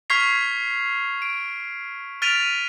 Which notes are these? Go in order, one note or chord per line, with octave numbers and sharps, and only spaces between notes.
C#6 F6 G#6 B6 C7 F7
D7
F6 A6 B6 D7 D#7 F7